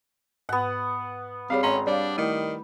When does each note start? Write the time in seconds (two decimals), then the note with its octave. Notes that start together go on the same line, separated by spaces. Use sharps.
0.49 G#2 B3 F#5
1.50 G3 C4 G#4 C#5 F5
1.63 G#1 C#4 D5 A#5 C6
1.87 G3 D4 C#5 F5
2.18 D#3 A3 E4